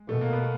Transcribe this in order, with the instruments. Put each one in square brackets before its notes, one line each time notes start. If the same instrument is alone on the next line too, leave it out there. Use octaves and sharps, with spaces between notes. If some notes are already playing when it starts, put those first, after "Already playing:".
Already playing: [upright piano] G#3
[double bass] B2 [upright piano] A3
[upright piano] A#3
B3